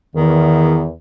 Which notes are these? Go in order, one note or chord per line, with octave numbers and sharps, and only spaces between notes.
E2 D#3